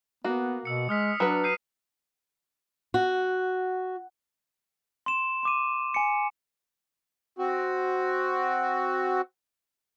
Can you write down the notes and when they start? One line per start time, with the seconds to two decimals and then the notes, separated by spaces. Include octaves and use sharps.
0.24 A#3 B3 F#4
0.65 B2 E6 C#7
0.89 G#3 D#6 F6 B6
1.20 F#3 D4 B4
1.44 G6 C7 D#7
2.94 F#4
5.06 C6 E7
5.43 C6 D6 D#7
5.94 G#5 C#7
7.39 C4 F#4